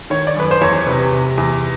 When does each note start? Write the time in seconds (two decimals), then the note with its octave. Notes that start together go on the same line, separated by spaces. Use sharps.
0.10 D#3 C#5
0.27 D5
0.36 F#2 B4
0.51 C5
0.61 E2 C#5
0.87 C3 B4
1.12 C3
1.38 E2